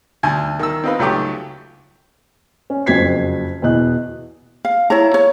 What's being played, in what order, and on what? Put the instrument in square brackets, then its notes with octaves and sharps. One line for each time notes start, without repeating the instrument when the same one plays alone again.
[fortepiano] D2 G#5 A5
D#3 E6
C4 D#4 F4 B4
C#2 F#3 A3 G4 D6
[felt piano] C#4
F#1 F2 F#4 G#6 B6 C7
E2 B2 D#5 F#6
[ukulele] F5
E4 C#5 A#5
C#5